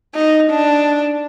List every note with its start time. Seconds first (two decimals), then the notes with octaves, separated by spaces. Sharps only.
0.15 D#4
0.51 D4